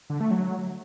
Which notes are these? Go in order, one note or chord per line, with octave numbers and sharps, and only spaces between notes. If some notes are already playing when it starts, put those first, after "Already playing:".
D3
A3
F#3